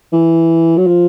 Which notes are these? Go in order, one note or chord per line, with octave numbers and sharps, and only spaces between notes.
E3
F#3
F3